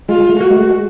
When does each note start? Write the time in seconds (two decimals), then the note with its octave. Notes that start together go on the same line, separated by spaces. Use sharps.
0.09 G#3 F4
0.19 G#3
0.29 A3
0.40 A#3 F#4
0.51 G#3
0.56 A3
0.70 G#3